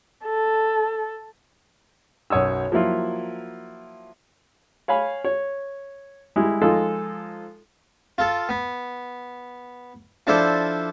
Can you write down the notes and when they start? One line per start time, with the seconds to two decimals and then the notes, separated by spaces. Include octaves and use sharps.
0.25 A4
2.30 B1 F#2 C#5 D#6 E6
2.72 F3 F#3 A#3 E4 F4
4.88 C#5 F5 G#5 B5
5.24 C#5
6.36 G3 G#3 E4
6.61 F3 G#3 D#4 F4 A4
8.18 F4 A4
8.49 B3
10.27 F3 D4 E4 A4 C5 D5